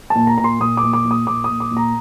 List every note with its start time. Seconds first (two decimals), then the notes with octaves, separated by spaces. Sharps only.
0.10 A5
0.15 A#2
0.27 A#5
0.38 A#2 A#5
0.44 C6
0.60 A#2 D#6
0.77 D6
0.83 A#2
0.93 D6
1.05 A#2
1.11 D#6
1.27 A#2 D6
1.44 A#2 D#6
1.60 D6
1.71 A#2
1.77 A#5